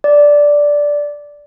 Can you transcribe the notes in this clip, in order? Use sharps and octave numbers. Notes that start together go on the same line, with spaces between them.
D5